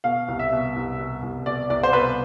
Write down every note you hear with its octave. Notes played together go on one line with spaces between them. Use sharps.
B2 F5
C2
E5
B2
C2
B2
C2
B2 D5
C2 D5
C5
B2 B4